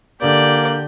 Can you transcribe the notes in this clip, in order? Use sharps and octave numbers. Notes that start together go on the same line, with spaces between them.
D3 A#3 G4 D5 G6